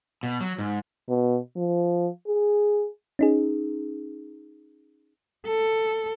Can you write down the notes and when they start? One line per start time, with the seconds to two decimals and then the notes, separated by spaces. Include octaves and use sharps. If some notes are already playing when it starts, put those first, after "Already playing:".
0.23 B2
0.41 F#3
0.59 G#2
1.09 B2
1.56 F3
2.27 G#4
3.19 C#4 D#4 G#4
5.47 A4